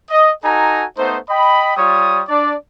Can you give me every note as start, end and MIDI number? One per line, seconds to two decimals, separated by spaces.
0.10 0.31 75
0.44 0.84 63
0.44 0.84 66
0.44 0.84 69
0.44 0.84 80
0.44 0.84 82
0.98 1.18 57
0.98 1.18 59
0.98 1.18 63
0.98 1.18 72
1.30 1.73 75
1.30 1.73 79
1.30 1.73 83
1.77 2.22 55
1.77 2.22 65
1.77 2.22 73
1.77 2.22 87
2.28 2.55 62
2.28 2.55 74